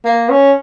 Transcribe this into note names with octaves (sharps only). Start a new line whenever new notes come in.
A#3
C#4